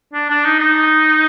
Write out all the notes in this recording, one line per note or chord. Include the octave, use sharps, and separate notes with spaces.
D4
D4
D#4
D#4